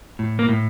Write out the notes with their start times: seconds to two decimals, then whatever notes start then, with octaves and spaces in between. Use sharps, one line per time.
0.19 A2
0.39 A#3
0.49 A2